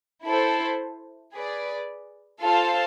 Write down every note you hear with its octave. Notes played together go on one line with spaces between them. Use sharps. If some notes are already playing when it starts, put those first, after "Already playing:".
E4 A4 C5
G#4 B4 D5
F4 A4 C5 F5 A5